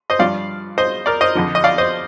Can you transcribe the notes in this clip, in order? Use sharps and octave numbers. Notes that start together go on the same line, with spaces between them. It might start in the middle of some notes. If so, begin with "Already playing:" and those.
C5 D#5
G2 F3 D5 F5
C5 D#5
A#4 D5
C5 D#5
F2 D3 F3
D#5
D5 F5
C5 D#5